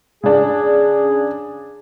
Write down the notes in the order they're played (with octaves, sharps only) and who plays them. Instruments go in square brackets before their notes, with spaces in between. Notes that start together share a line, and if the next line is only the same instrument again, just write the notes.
[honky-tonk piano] C#3 D4 [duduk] G#4